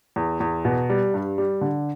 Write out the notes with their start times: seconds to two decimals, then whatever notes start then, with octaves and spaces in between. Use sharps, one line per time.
0.16 E2
0.40 E2
0.65 B2
0.90 G3
1.14 G2
1.38 G3
1.61 D3